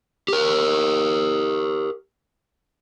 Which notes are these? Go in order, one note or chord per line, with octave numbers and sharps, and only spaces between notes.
G4 A#4